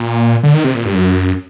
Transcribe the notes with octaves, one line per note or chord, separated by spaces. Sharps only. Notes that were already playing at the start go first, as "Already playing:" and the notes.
Already playing: A#2
D3
D#3
C3
A#2
G2
F#2